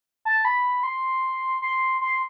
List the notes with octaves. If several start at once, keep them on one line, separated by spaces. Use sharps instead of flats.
A5
B5
C6
C6
C6